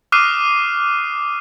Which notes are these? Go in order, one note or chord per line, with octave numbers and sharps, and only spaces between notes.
D6 D#6 F6 F#6 C7 D#7